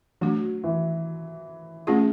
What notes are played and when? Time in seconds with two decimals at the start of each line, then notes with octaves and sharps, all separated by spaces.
0.21 F#3 A3 D4 F#4
0.64 E3
1.87 A3 C#4 F4 G#4